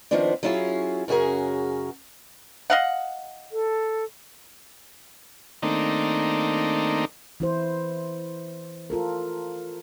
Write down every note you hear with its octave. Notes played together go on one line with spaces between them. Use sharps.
D#3 F3 B3 C4 D4
F#3 B3 C#4 E4 F4 G#4
F#2 C#3 F#4 G#4 A#4
D#5 F5 F#5
A4
D#3 A3 A#3 C4 D4 D#4
E3 E4 C5
F4 A4 A#4